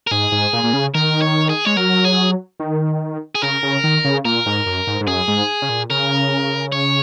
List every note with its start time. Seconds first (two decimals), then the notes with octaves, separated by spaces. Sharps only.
0.07 A#4
0.11 G#2 G#4
0.32 G#2
0.53 A#2
0.64 A#2
0.73 C#3
0.95 D#3 A#4
1.22 C#5
1.49 G#4
1.65 G#3 C#5
1.77 F#3 A#4
2.05 G#4
2.60 D#3
3.35 G#4
3.42 C#3 A#4
3.63 C#3
3.84 D#3
4.05 C#3
4.25 A#2 A#4
4.46 G#2
4.66 F#2
4.87 G#2
5.01 G#2
5.07 F#2 G#4
5.28 G#2
5.62 C#3
5.69 A#2
5.90 C#3 A#4
6.72 C#5